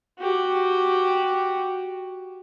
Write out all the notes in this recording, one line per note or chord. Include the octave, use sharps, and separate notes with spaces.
F#4 G4